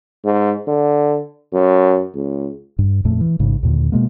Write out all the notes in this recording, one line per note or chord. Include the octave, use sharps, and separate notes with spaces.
G#2
D3
F#2
C#2
G2
F2 A#2 A3
E3
A1 G#2 C#3
D#2 A#2 D3
B2 G#3 A#3